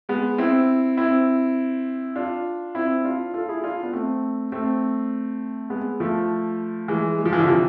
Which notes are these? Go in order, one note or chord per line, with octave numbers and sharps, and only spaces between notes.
G#3 B3
C4 E4
C4 E4
D4 F4
C4 E4
D4 F4
F4 A4
E4 G#4
D4 F4
B3
A3 C4
A3 C4
G#3 B3
F3 A3
E3 G#3
G#3
F3
E3
D3 F3
C3 E3